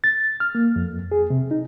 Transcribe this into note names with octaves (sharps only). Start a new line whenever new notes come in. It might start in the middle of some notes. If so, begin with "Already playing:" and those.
A6
F6
A#3
F2
G#4
C3
D#4